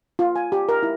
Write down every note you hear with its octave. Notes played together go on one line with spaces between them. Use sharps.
F4
G#5
G4
A#4
E4